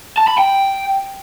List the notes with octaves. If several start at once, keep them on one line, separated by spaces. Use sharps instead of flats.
A5
B5
G5